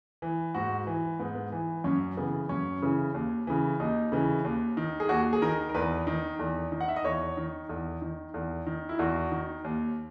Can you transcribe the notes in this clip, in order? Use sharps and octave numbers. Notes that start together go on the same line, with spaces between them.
E3
G#2 F#4
E3
G#2 B3
B3
E3
F#2 C#4
C#3 E3 B3
F#2 C#4
C#3 E3
D#2
C#3 E3
D#2 D#4
C#3 E3
D#2
D#3
G#4
D#2 F#4
G#4
D#3 A#4
A#4
E2 B4
D#3
E2
D#3
F#5
E5
D#5
E2 C#5
D#3
E2
D#3
E2
D#3
E4
E2 F#4
D#3
D#2